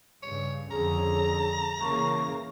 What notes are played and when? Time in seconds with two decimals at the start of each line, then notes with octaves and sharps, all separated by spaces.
0.22 G2 C#3 C#5
0.71 F2 D3 C#4 G#4 A#5
1.82 C#3 E3 A#3 C#6